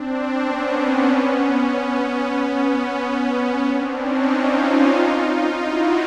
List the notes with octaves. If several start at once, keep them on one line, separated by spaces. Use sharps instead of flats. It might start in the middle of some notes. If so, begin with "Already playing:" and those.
Already playing: C4 D4
B3 C#4
B3 C#4
C4 D4
C#4 D#4
D#4 F4
E4 F#4